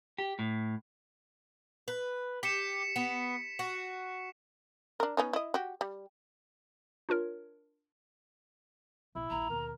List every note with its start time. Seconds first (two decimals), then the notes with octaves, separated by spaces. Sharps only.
0.18 G4
0.39 A2
1.88 B4
2.43 G4 B6 C#7 E7
2.96 B3
3.59 F#4
5.00 D4 A#4
5.17 B3 C#4 D#4
5.33 E4 D#5
5.54 F#4 G4
5.81 G3
7.09 D4 F4 A#4 C#5
9.15 B1 A2 E4
9.30 A#1 D#2 A#5
9.50 D#2 B2 A#4